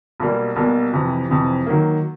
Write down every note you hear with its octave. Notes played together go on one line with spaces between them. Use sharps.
B1 B2 G3 A#3
B1 B2 G3 A#3
F2 C3 E3
F2 C3 E3
D#3 F#3 A#3